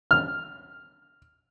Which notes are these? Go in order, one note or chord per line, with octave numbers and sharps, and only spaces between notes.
F6